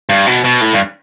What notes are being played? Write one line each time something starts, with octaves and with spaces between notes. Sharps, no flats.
G2
B2
B2
A2
G2